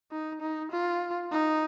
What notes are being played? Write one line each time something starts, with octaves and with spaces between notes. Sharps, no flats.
D#4
D#4
F4
D#4